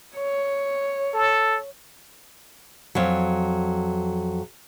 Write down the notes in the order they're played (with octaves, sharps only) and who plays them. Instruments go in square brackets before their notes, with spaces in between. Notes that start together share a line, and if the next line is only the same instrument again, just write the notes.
[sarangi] C#5
[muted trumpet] A4
[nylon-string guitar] F2 F#3